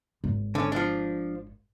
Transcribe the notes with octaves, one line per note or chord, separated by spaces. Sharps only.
G#1
D3 C#4
F3 D4